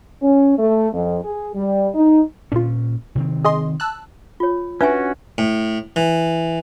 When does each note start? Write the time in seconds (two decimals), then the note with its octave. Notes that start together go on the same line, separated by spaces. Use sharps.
0.22 C#4
0.58 A3
0.93 F2
1.23 G#4
1.54 G3
1.95 D#4
2.52 A#2 D3 C#4 F4
3.15 C3 D#3 C4
3.45 G#4 D#5 C6
3.80 A5 E6 F#6
4.40 F4 C#5
4.81 C#4 D4 F#4 B4 E5 G#5
5.38 A2
5.96 E3